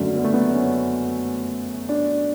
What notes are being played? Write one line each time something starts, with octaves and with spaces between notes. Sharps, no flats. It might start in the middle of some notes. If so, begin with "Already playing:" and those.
Already playing: F#1 F#2 D3 A3
B3
A3
B3
C#4
D4